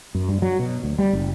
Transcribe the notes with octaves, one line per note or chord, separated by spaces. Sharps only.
F#2
G2
F#3
B2
D2
G3
F#1